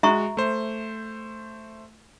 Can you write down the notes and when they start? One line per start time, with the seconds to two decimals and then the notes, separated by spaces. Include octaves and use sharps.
0.03 G#3 F#4 E5 A#5 C#6
0.37 A3 C5